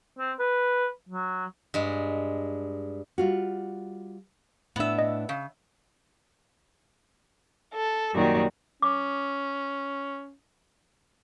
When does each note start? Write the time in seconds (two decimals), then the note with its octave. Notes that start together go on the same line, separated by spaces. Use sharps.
0.19 C4
0.39 B4
1.09 F#3
1.74 G2 G#3
3.18 G3 F4 F#4
4.76 A2 B3 D4 E5
4.99 D#5
5.29 C#3
7.74 A4
8.13 F#2 A#2 D#3 G3 F#4
8.82 C#4 D6